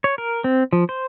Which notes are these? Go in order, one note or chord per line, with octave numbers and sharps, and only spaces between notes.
C#5
A#4
C4
F3
C5